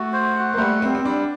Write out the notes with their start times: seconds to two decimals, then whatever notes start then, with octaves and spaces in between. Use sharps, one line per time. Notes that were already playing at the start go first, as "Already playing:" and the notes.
Already playing: A3 F#4
0.13 C5
0.35 F#5
0.54 A#3
0.58 G3 A3
0.82 G3 C4
0.95 C4
1.04 G3 D4